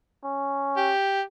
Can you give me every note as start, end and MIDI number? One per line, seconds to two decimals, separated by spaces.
0.24 0.92 61
0.77 1.22 67